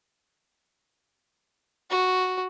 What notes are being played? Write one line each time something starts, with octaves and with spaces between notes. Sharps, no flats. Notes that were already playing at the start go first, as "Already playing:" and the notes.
F#4